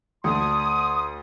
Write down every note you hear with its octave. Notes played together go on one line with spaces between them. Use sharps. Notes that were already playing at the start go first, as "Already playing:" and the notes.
D2 D4 C6 D#6